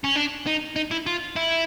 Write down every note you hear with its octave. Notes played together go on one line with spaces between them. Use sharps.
C#4
D4
D#4
D#4
E4
F4
E4